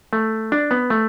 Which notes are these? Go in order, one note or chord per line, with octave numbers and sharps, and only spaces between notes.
A3
D4
B3
A3